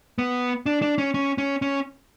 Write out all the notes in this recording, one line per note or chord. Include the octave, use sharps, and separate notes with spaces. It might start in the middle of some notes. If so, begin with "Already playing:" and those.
B3
D4
D4
C#4
C#4
C#4
C#4